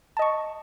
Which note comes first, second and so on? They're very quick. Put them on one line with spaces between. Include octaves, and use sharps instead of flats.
A5 D#5 C#6